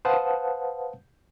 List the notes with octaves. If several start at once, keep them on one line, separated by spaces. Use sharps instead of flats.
B4 C5 F5 F#5 A5 D#6